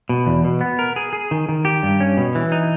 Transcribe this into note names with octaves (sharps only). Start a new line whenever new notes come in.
B2
E2
B2
B3
A#4
G#4
G#4
D#3
D#3
G4
G2
C#4
B2
E3
D#4